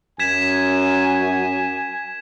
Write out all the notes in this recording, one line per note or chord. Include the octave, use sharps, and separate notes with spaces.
F#2 G#5 G#6 B6 E7